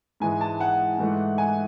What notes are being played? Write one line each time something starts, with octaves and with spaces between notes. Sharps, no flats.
G#2 E3 G#3 G#5
A5
F#5
G#2 E3 A3
G#5